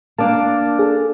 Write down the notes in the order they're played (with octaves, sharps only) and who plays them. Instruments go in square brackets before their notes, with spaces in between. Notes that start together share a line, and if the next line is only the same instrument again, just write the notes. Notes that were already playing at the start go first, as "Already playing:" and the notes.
[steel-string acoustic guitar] A#3 D4 [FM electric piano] A5 D6
[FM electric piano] G#4 A4